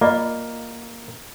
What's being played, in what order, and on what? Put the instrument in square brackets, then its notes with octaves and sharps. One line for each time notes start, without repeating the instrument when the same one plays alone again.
[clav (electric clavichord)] A#3 [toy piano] F4 D5 D#5